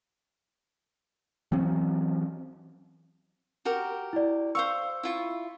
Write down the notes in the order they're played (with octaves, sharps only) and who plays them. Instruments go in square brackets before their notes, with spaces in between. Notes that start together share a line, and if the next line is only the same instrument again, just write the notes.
[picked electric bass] E3 F#3 C4 C#4
[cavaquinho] F#4 G4 A#4
[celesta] E4 D5
[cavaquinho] C5 F5 C#6 [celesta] E6
[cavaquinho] E4 F4 C#6